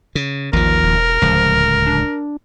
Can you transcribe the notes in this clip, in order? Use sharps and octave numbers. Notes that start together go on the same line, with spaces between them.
C#3
A1 D#2 F3 A#4
E1
D1 C#2 F3
D4